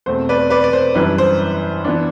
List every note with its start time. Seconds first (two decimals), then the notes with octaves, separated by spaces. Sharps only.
0.06 E2 B2 A3 C4 C5
0.29 B4 D5
0.50 B4 D5
0.64 D5
0.73 C5
0.95 F#2 E3 G3 D4 B4
1.18 C5
1.84 E3 B3 D4